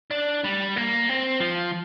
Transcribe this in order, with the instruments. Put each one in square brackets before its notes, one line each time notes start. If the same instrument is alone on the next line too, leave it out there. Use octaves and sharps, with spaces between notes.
[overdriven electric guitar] D4
G3
A#3
C4
F3